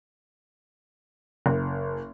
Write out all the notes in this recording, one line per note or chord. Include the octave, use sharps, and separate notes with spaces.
F#1